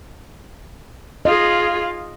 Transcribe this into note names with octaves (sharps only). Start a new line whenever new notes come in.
F4 G#4 D#5